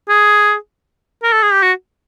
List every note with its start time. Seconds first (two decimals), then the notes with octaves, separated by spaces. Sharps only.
0.09 G#4
1.23 A#4
1.33 A4
1.42 G#4
1.53 G4
1.63 F#4